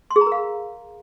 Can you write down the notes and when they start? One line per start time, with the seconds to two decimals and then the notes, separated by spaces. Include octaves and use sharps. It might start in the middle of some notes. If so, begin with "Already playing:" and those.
0.11 C6
0.16 G#4
0.21 A#5
0.27 A#4
0.32 F5